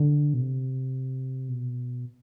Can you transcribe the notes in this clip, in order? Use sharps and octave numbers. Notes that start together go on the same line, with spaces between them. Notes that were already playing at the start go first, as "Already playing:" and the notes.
Already playing: D3
B2
C3
B2